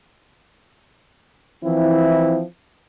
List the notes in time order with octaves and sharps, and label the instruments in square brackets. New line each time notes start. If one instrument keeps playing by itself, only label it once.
[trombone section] E3 F3 C4 E4